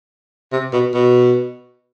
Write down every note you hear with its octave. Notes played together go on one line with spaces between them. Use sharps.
C3
B2
B2